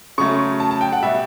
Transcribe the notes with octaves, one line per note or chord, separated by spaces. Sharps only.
C#3 F#3 A3 C#6
A5
A5
G5
F#5
B2 G3 E5